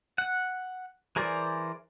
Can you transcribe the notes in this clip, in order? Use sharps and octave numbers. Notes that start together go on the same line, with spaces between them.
F#5
E3 G#4 A#4 C5 D5